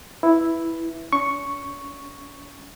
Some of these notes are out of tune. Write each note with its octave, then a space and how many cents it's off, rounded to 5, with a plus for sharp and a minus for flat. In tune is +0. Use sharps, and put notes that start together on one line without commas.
E4 +0 B4 +0
C#4 +40 C#6 +0